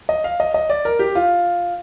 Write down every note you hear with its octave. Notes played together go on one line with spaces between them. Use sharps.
D#5
F5
D#5
D#5
D5
A#4
G4
F4